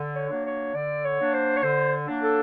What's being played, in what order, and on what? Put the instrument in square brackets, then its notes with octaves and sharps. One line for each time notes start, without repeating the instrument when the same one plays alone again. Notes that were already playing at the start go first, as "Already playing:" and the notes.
Already playing: [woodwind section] D3
[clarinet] C#5
[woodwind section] F#3 A#3 D4
[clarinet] C#5
[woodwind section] D3 [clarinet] D5
[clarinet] C#5
[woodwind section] F#3 A#3 D4
[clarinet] C5
C#5
[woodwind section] D3 [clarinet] C5
[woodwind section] F#3 A#3 D4
[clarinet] A4